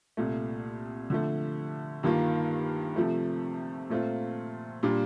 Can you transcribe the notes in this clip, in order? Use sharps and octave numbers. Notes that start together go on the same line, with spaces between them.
C2 A#2 A3
D3 F3 A3
G2 D#3 A#3 F4
C3 F3 A3
A#2 A3 C4 F4
A#2 G3 D4 F4